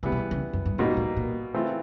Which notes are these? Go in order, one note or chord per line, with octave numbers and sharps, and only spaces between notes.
C3 E3 G3 B3
B2
C#3
F#2
G2
G#2 B2 G3 A#3 D#4
A2
A#2
E3 A3 C4 F4